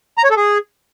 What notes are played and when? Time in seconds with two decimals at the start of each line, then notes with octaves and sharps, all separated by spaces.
0.18 A#5
0.24 C#5
0.30 A4
0.37 G#4